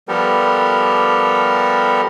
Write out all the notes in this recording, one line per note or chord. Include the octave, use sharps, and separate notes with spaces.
F3 G3 B3 G4 A4 A#4